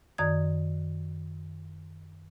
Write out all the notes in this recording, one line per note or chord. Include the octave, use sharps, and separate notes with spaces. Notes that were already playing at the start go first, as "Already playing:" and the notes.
F#2 D#3 D5 D#6 G#6